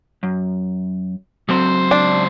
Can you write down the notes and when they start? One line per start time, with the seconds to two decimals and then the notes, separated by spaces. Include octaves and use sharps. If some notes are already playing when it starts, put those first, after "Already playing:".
0.23 F#2
1.49 C#2 F#3 C4 C5
1.91 D4